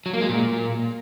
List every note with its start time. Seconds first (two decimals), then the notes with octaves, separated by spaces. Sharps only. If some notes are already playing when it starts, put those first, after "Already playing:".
0.06 F#3
0.13 A#3
0.21 G#3
0.29 A#2